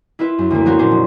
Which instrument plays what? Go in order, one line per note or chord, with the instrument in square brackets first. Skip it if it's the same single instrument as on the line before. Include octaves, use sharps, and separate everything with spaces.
[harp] E4 F4 B4 E5
F#2
D2 A#3
F3 B3 C#4 F#4 A#4 C5
A#2 C#4 D4 C5
F1